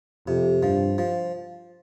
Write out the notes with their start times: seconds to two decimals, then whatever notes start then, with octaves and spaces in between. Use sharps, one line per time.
0.27 F2 C3
0.63 G2 F3
0.98 F3